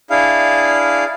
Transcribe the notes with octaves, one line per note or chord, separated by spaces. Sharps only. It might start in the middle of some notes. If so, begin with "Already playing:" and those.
D4 E4 G#4 F5